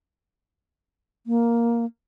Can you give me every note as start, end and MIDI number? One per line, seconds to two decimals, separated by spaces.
1.27 1.85 58